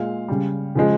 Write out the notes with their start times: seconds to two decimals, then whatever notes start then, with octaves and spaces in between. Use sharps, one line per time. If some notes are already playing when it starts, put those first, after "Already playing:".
Already playing: A#2 G#3 F5
0.28 C#3 G3
0.75 C#3 F3 G#3